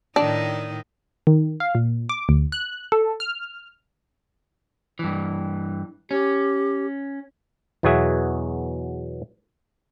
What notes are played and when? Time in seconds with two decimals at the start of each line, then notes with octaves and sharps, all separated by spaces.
0.16 A2 D#3 D4 D#4
1.27 D#3
1.60 F5
1.75 A#2
2.09 D6
2.29 D2
2.52 F#6
2.92 A4
3.20 F6
4.99 G2 E3
6.11 C#4 G4
7.83 E2 B2 F#3 F#4 G#4 E5